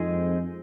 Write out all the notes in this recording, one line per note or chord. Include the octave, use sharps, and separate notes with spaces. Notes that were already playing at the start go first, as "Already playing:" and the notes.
Already playing: F2 G#3 C4 D#4 G#4 D#5